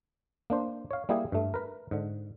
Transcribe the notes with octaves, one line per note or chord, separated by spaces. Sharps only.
A#3 D4 C5
C#5 F5
G3 A#3 E4 G4 G#4
G2 A3
A#4 B4
G#2 D3